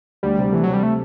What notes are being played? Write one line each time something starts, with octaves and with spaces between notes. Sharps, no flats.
D2 G3
C3
E3 A3
F#3
C3
G3
A3